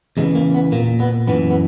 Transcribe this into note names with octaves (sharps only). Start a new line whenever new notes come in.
E2 C#3 E3 G#3
A#3
B3
A#2 A#3
B3
F#2 E3 B3
B3